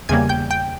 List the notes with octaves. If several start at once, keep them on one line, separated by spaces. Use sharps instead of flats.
E2 C#3 G3 A#3 G#5 G#6
G5 G6
G5 G6